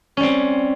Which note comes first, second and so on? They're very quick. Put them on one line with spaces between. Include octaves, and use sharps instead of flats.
C#4 G3 C4